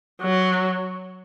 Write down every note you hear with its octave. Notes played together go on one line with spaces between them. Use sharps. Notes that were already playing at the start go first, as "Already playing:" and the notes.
F#3